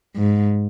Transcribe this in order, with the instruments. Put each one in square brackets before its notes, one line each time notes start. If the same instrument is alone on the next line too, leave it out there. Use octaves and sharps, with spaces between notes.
[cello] G#2